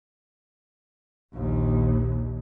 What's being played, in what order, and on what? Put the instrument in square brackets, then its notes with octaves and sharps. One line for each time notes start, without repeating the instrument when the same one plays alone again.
[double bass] A#1 D#2